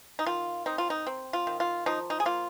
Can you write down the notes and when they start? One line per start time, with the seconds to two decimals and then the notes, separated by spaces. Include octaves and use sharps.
0.19 D#4
0.26 D#3 F4
0.66 C4 D#4
0.78 F4
0.90 D#4
1.07 C4
1.33 F4
1.47 D#3
1.60 F4
1.86 F3 D#4
2.10 D#4
2.20 G#4
2.26 A#3 F4